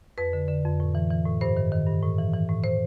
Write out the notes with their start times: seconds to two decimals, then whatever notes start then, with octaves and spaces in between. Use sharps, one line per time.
0.18 F2 B4
0.33 D3
0.48 D3
0.65 F2
0.80 A2
0.95 E3
1.10 E3
1.26 A2
1.41 G2 C5
1.57 D#3
1.72 D#3
1.87 G2
2.02 A2
2.19 E3
2.33 E3
2.49 A2
2.64 C5